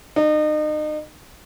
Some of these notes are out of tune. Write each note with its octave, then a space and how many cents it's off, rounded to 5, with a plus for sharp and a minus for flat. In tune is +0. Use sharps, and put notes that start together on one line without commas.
D#4 -35